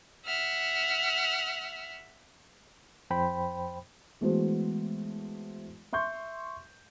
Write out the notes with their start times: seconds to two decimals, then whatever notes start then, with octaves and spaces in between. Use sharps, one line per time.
0.24 E5 F#5 F6
3.10 F2 C5 G5 B5
4.21 E3 G#3 A3 B3 F#4 C5
5.93 E5 C6 C#6 G6